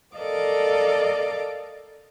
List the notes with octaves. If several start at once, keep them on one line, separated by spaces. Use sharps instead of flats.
A4 A#4 D5 D#5 F5 D6